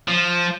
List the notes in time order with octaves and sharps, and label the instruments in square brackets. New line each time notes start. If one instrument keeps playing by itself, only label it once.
[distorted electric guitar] F3